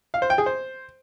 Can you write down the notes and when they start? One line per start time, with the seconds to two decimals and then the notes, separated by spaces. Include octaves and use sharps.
0.14 F5
0.22 C5
0.30 G5
0.38 G#4
0.46 C5